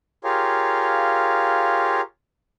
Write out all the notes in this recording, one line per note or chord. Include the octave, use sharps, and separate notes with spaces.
F4 G4 G#4 A#4 C#5 F5